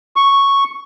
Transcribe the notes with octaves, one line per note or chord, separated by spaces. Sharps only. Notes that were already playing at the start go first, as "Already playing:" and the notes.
C#6